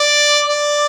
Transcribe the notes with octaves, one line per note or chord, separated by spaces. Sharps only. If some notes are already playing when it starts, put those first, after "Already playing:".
Already playing: D5
D5